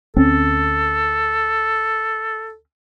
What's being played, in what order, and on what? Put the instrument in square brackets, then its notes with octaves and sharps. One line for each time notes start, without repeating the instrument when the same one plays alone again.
[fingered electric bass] D2 C4 C#4 [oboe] A4